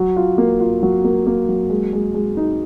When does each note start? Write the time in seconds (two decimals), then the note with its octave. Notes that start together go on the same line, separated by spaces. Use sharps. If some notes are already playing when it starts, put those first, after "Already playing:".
Already playing: F#3
0.17 F4
0.38 A#3
0.60 F4
0.83 F#3
1.04 A#3
1.26 A#3
1.49 F#3
1.70 G#3
1.93 G#3
2.14 G#3
2.37 D#4